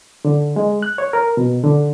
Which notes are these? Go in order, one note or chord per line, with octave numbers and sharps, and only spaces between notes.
D3
G#3
F#6
C#5
A#4
B2
D3